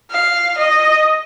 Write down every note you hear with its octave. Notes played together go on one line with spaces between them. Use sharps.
F5
D#5